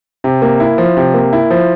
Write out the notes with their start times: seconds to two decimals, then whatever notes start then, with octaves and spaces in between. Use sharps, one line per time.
0.24 C3
0.42 A#3
0.60 E4
0.78 F3
0.97 C3
1.14 A#3
1.33 E4
1.50 F3